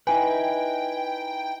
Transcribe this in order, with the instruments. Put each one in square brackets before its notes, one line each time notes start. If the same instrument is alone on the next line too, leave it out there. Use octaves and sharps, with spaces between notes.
[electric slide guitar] D#4 E4 B4 [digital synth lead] G5 [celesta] G#5